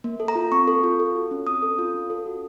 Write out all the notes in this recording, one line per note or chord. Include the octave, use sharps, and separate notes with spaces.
A#3
A4
A#5
F4
C4 C#6
A4
F4
A4
F#4
C#4
C4 D#6
A4
F4
C#4
A4
F#4